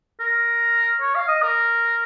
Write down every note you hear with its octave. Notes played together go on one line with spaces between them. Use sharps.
A#4
C#5
F5
D#5
A#4